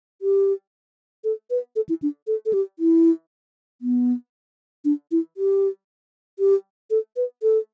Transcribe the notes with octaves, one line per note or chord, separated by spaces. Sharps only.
G4
A4
B4
A4
E4
D4
A4
A4
G4
E4
B3
D4
E4
G4
G4
A4
B4
A4